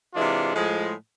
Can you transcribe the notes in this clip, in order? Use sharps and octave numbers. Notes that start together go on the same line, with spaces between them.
C3 E3 G#3 D4 F4
A2 F3 G#3